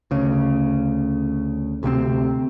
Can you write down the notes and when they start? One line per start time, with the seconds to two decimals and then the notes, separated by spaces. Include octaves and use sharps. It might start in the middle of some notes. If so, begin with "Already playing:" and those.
0.11 D2 C#3
1.83 D2 C3 A#3 C4